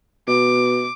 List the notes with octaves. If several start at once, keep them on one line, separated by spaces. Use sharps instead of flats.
B2 D6